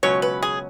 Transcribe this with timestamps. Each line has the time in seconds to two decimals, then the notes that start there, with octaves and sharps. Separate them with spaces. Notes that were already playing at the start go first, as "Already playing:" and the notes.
0.03 C#2 B2 F#3 C#4 C#5
0.22 B4
0.42 G#4